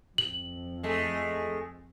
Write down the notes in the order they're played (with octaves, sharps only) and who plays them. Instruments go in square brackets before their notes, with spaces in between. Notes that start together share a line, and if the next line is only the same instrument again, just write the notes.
[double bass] F2 [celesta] F#7
[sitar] G#3 A3